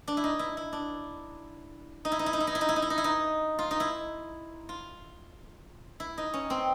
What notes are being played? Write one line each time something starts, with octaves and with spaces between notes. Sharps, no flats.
D4
E4
D#4
E4
E4
D4
D#4
E4
D#4
E4
D#4
E4
D#4
E4
D#4
E4
D#4
E4
D#4
E4
D#4
F4
D#4
E4
F4
E4
D#4
C#4
C4